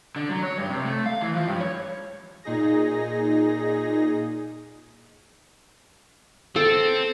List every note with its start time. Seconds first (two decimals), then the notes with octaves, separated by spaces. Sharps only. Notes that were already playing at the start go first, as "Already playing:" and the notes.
0.16 D3
0.30 F#3
0.43 C#5
0.58 G2
0.69 C3
0.85 A3
1.06 F5
1.21 E3
1.35 F3
1.47 G2
1.60 C#5
2.44 A#2 D#4 G#4 A#6
6.56 C4 A4